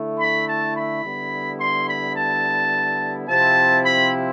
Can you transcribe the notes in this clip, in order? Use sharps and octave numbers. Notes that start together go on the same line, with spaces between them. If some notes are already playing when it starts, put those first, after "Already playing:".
Already playing: D3 A3 E4
B5
A5
B5
D3 G3 B3 E4
C6
B5
A5
C3 F3 C4 E4 A5
B5